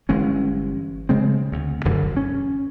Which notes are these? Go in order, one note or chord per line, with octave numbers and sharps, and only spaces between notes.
G1 E3 G#3 C#4
C#3 G#3 C4
D2
E1 F#2 D3
C#4